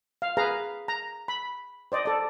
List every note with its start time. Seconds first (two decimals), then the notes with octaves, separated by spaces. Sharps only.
0.22 F5
0.37 G#4 B4 F5 A#5
0.88 A#5
1.28 B5
1.92 C5 D5 D#5
2.05 A4 D5